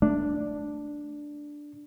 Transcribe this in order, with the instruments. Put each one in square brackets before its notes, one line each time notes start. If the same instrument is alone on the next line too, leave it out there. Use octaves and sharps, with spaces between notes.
[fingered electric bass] A3 [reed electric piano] D4